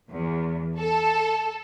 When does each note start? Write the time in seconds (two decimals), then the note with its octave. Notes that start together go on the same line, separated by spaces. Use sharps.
0.10 E2
0.78 A4